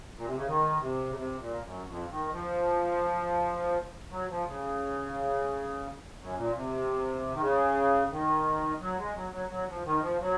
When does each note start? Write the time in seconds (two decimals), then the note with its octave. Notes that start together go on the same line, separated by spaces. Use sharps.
0.16 A#2
0.26 C3
0.36 C#3
0.47 D#3
0.80 C3
1.10 C#3
1.16 C3
1.39 A#2
1.62 F#2
1.85 F2
2.09 D#3
2.32 F3
4.11 F#3
4.29 F3
4.46 C#3
6.20 F#2
6.36 A#2
6.55 C3
7.33 D#3
7.41 C#3
8.11 D#3
8.80 F#3
8.97 G#3
9.15 F#3
9.33 F#3
9.49 F#3
9.67 F3
9.84 D#3
10.02 F3
10.20 F#3